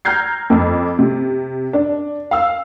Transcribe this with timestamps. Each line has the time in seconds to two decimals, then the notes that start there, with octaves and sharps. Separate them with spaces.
0.05 A#5 F6 G6 G#6 C7
0.50 F2
0.99 C3
1.73 D4
2.31 F5 E6